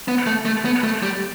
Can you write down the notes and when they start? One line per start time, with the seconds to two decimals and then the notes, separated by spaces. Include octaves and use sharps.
0.08 B3
0.27 A3
0.45 A3
0.65 B3
0.84 A3
1.03 G3